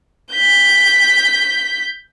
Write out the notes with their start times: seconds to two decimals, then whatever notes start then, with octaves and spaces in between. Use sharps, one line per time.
0.32 G6 B6